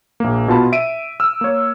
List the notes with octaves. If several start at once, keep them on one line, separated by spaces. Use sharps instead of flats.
A#1 A#3
B2 F4 A5 B5
E5 D7 D#7
E6 F6
A#3 C#5